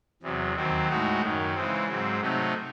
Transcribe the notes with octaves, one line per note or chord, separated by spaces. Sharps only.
E2 C3 F#3
D#2 D#3 F#3 C4
A2 G#3 D#4 F#4
F#2 D#3 F#3
C#3 E3 G#3 C4
G#2 F#3 C4
C3 F#3 A3 D#4